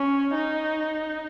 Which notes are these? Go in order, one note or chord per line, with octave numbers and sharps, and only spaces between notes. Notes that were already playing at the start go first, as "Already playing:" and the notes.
Already playing: C#4
D#4